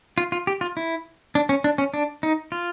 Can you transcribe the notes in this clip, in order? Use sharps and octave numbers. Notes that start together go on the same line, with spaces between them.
F4
F4
G4
F4
E4
D4
C#4
D4
C#4
D4
D#4
F4